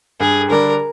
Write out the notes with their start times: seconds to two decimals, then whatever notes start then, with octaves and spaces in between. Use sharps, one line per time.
0.20 G2 G#4
0.50 D3 G3 D4 A#4